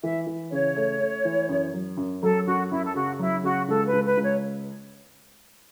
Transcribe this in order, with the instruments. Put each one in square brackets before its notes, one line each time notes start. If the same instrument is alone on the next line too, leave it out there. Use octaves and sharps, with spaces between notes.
[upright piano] E3 [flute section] E5
[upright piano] E3
[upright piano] C#3 [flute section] C#5
[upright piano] A3
A3
E3
F#2
F#3
F#2
[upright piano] F#3 [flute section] A4
[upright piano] F#2 [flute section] F#4
[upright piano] F#2 [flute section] E4
[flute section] A4
[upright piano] C#3 [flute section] F#4
[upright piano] F#3 [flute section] E4
[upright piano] C#3 [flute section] F#4
[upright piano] C#2 [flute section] A4
[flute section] B4
[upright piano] C#2
[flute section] B4
[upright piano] C#2
[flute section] C#5